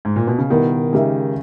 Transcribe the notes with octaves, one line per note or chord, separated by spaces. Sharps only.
G#2
A#2
B2
C#3
B2 D#3 G3 B3 E4 A#4
C#3 G#3 D#4 G4 A#4 E5